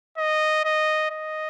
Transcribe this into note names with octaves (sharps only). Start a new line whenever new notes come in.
D#5
D#5
D#5